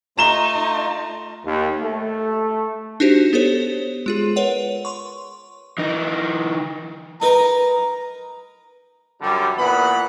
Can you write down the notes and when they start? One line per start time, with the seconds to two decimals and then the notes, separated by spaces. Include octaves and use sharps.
0.18 A3 D#4 F4 A#5 E7 G7
1.45 D#2
1.82 A3
3.00 D4 D#4 F#4 G4 C5
3.33 B3 G4 A4 C5 C#5
4.06 G#3 F4 G#4
4.36 A#4 B4 C#5 F#5
4.85 C6 C#6
5.78 E3 D#4
7.22 D#4 A#4 B4 A#5
9.21 F#2 D3 G3
9.58 A#2 E3 B3 F#5 B5